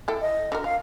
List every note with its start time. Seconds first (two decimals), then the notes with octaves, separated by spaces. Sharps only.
0.08 E4 A4 G5
0.21 D#5
0.52 D3 F#4 A#4
0.64 F4 F5